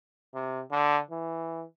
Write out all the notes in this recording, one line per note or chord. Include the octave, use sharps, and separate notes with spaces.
C3
D3
E3